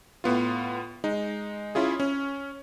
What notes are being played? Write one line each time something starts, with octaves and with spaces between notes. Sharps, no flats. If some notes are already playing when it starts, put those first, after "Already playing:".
A2 B3 F4
G#3 D#4
C#4 E4 F4 G#4
C#4